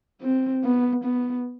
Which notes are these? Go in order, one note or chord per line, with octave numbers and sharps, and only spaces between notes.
C4
B3
B3